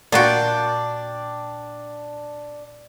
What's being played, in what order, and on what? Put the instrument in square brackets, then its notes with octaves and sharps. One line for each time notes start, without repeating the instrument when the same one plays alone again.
[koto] A#2 F4 F#4 [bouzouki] D4 G5